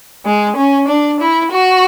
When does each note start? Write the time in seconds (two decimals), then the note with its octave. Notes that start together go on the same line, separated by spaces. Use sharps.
0.25 G#3
0.56 C#4
0.88 D4
1.20 E4
1.52 F#4